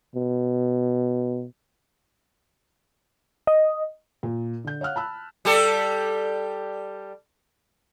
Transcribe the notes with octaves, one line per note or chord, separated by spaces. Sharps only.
B2
D#5
A#2
D3 G6
C#5 F5 F#5 F6 F#6
A5 B5 E6 F#6
G3 G4 A4